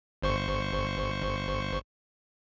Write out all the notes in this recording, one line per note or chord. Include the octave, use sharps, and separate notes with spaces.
G1 C5 C#6